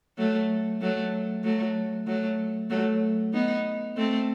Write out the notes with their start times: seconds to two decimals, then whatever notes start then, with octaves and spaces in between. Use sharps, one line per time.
0.18 F#3 A3
0.81 F#3 A3
1.44 F#3 A3
2.07 F#3 A3
2.70 F#3 A3
3.33 B3 D#4
3.97 A3 C4